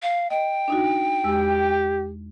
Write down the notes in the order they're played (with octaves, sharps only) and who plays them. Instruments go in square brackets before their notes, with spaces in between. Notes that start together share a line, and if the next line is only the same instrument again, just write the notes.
[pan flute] F5
[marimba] D#5 [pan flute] G5
[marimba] D4 D#4 F#4
[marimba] E2 G#3 E6 [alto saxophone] G4